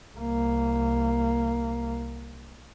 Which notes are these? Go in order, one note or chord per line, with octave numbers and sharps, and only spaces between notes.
C2 A#3